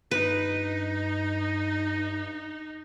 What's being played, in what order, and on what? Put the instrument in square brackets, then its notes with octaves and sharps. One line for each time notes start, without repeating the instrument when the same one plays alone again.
[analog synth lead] G2 [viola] D#4 [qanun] B4